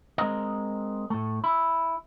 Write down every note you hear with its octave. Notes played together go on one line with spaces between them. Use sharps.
G#3 C4 A#4 D#5
A2 A3
E4